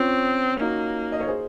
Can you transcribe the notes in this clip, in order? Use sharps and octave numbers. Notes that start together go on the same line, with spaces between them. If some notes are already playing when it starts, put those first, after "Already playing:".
Already playing: C4 C#4 F4
A#3 D#4 F#4
D#5
C#5
G#4 C5